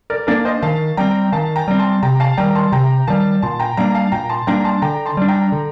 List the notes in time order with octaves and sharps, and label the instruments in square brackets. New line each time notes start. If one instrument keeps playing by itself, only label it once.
[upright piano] A#4 D5
[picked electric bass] A#3 D4 [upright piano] A#4 D5
[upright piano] C5 D#5
[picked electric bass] D#3 [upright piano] F5 A5
[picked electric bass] G3 C4 [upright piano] G5 A#5
[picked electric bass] D#3 [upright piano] F5 A5
[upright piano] G5 A#5
[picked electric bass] G3 C4
[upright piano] A5 C6
[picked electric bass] C3 [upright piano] G5 A#5
[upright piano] F5 A5
[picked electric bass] D#3 G3 [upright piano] G5 A#5
[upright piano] A5 C6
[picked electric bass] C3 [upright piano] G5 A#5
[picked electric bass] D#3 G3 [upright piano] F5 A5
[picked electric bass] A#2 [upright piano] A5 C6
[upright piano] G5 A#5
[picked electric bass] G3 A#3 D4 [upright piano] G5 A#5
[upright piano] F5 A5
[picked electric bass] A#2 [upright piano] G5 A#5
[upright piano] A5 C6
[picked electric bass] G3 A#3 D4 [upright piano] G5 A#5
[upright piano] A5 C6
[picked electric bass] D3 [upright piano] G5 A#5
[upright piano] A5 C6
[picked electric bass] G3 D4
[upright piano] G5 A#5
[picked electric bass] D3